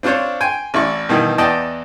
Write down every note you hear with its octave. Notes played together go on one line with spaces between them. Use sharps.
C4 D4 F4 C5 C#5
G5 G#5 C6
A1 E4 D5 C#6
G2 B2 D#3 E3
E2 B3 D5 D#5 G5 A5